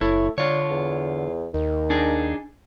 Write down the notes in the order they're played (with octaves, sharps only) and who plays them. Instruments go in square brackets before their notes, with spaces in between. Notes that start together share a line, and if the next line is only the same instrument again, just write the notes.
[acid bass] F#1 [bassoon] A3 [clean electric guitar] E4 C#5
[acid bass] D3 [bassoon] D4 [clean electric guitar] F4 C#5
[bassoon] E2
[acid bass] D#2 [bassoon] D#3
[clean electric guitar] D4 D#4 G#4